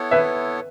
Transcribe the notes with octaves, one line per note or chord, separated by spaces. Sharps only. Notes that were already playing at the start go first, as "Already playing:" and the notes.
Already playing: B3 E4 A4 C#5
B4 E5